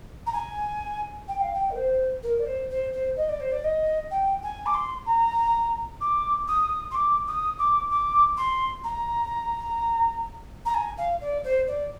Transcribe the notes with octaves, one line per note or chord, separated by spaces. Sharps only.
A#5
G#5
G5
F5
G5
A#4
C5
A#4
D5
C5
C5
C5
D#5
D5
C5
D5
D#5
G5
G#5
D6
C6
A#5
D6
D#6
C6
D6
D#6
D6
D6
C6
A#5
A#5
G#5
F5
D5
C5
D5